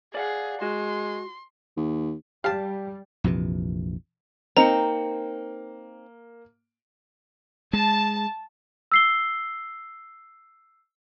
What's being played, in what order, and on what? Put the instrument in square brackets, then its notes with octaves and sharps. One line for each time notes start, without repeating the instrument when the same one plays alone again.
[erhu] G#4 [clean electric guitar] D5 F5 F#5
[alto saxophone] G#3 [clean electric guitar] F#4 [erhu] C6
[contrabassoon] D#2
[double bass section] G3 [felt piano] G4 [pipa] F5 A5
[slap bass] A#1 F2 C3 E3
[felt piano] A#3 C#7 [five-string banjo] C4 D#4 [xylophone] A#5
[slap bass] G#3 [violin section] A5
[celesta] E6 C7 G7